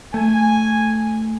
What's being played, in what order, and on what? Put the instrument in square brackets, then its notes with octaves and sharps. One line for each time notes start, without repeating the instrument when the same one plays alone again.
[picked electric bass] A3 [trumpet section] G#5